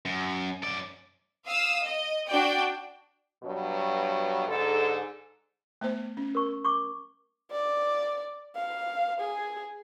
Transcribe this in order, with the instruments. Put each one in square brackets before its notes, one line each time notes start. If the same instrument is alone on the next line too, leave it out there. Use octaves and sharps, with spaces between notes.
[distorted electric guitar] F#2
F#2 D5
[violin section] F5 D#6 E6
D#5
D4 F#4 D5 G5
[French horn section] G2 B2 F#3
G#2 D3 A4
[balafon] A3 B3 C5 [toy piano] E5
[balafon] C#4
[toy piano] A#4 C#6
C#6 D6
[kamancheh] D5
F5
G#4